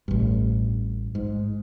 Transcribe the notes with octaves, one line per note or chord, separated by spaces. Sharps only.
A1 G2
G#2